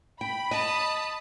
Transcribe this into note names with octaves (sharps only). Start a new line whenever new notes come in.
G5 B5
D#5 A5 D#6